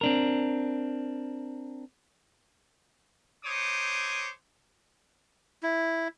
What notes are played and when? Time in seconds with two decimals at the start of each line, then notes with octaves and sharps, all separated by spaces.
0.01 C4 D4 A#4
3.44 D4 D#4 C5 C#5 D6 D#6
5.63 E4